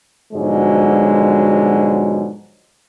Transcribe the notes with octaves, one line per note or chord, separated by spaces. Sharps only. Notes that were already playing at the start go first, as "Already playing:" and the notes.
G#2 B2 D3 F3 F#3 G#3